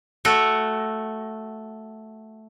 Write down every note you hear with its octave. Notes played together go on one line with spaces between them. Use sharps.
A3 F#4